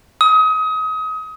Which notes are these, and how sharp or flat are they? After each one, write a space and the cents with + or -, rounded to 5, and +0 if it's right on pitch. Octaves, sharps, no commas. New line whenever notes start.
D#6 +30